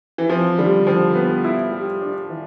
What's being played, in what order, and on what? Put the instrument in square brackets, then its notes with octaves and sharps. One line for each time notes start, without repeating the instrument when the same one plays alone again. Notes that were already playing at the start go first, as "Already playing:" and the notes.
[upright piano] E3
[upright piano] F3 [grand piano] C4
[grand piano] D3 [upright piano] G3
[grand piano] D3 [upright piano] F3
[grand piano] B3
E4
G3
D4
E3